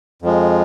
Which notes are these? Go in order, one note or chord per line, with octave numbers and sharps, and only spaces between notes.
F2 F3 G#3